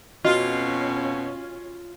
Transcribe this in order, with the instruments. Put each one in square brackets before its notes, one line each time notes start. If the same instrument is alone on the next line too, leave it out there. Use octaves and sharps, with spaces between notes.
[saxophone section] F2 B2 [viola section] C#4 [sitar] F4 [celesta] F#4 D#5